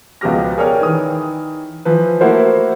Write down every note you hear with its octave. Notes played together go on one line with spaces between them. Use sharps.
C#2 B2 F3 G4 F6 A#6
G#4 A#4 C#5 D5 G5 F6
D#3 E3 D#6
E3 F3 B4
A3 A#3 E4 F#4 A#4 C5